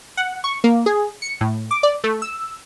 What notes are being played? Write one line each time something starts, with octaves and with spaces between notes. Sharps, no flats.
F#5
C#6
A#3
G#4
C#7
A2
D6
D5
A3
E6